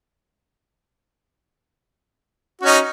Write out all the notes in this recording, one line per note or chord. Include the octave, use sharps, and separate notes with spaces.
C#4 D#4 F#4